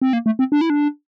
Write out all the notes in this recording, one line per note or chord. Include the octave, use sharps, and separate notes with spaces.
C4
A#3
A3
C4
D4
E4
D4